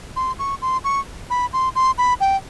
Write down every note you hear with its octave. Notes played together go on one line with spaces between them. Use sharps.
C6
C#6
C6
C#6
B5
C6
C6
B5
G5